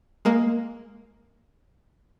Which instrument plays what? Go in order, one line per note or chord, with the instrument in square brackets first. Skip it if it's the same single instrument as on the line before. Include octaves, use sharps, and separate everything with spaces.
[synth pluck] G#3 A#3